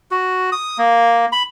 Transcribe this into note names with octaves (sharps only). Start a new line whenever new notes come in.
F#4
D#6
A#3
B5